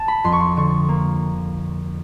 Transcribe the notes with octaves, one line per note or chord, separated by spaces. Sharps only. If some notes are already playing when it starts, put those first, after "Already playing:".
Already playing: A5
B5
F2 C6
C#6
C6
D3 C#6
A#3